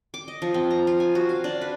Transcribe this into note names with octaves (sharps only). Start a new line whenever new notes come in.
D6
D#5
F3
C4
A#5
F4
G#5
F#4
F5
D4
B4